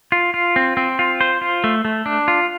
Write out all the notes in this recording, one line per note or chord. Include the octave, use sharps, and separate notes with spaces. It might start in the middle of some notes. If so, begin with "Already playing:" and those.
F4
F4
C4
C4
F4
C5
F4
A3
A3
D4
F4